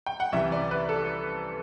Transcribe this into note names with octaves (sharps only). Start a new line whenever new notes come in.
G5
F#5
C2 C3 E3 E5
D5
B4
A4